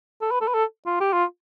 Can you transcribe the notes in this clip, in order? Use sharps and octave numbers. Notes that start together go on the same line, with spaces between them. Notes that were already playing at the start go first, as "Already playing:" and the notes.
A4
B4
A4
B4
A4
F4
G4
F4